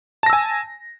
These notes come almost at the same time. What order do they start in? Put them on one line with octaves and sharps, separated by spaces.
A5 A#6 E6 G#5